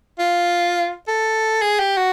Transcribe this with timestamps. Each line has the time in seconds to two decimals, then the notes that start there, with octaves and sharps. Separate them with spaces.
0.20 F4
1.08 A4
1.62 G#4
1.80 G4
1.97 F#4